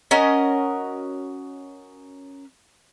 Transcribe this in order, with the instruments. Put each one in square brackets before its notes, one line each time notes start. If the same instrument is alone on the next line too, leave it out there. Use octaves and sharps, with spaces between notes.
[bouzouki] C#4 F#4 A#4 D#5